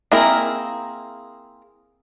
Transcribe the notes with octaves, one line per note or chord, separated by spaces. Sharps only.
A#3 C4 E4 G#4 A#4